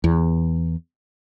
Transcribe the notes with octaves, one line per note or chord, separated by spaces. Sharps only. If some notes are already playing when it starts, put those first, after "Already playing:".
E2